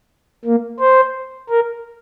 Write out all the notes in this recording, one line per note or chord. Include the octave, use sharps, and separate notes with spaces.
A#3
C5
A#4